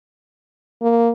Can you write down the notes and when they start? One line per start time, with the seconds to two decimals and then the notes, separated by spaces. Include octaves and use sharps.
0.82 A#3